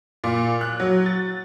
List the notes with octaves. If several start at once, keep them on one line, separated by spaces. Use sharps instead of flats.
A#2
F#6
F#3
A6